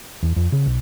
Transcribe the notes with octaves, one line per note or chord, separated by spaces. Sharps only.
E2
F2
C#3
B1